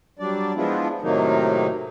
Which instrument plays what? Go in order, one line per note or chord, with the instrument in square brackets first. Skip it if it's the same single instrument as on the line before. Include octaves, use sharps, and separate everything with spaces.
[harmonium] F#3 G3 D4 D5
F3 G#3 B3 D4 E4 F4
A2 C3 D#3 F#3 A#3 D#4